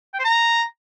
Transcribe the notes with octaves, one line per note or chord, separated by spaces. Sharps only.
G5
C5
A#5